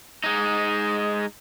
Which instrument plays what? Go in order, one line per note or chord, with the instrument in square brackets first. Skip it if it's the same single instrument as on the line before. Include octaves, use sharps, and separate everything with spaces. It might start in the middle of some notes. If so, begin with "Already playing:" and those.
[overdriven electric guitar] G#3 D#4